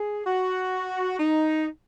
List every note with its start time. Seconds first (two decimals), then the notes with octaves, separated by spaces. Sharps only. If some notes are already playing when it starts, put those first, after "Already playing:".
Already playing: G#4
0.25 F#4
1.18 D#4